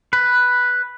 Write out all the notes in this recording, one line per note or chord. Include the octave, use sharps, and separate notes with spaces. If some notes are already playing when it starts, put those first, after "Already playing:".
B4